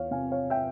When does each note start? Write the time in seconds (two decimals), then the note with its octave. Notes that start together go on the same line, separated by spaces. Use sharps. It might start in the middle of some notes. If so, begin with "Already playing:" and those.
Already playing: E2 C#5 F5
0.11 C3 F5 G#5
0.32 C#5 F5
0.50 E5 G5